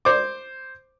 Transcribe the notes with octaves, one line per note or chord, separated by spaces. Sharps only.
C5 D6